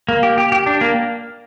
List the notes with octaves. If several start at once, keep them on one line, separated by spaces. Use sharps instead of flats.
A#3
G4
G4
G4
D4
A#3